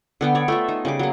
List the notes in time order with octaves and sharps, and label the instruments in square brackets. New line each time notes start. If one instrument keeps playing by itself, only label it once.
[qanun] D3 B3 G5
C#5 D5
A3 F4 E5
D#4
C#3 G3 G#4 D6
F#3 A#3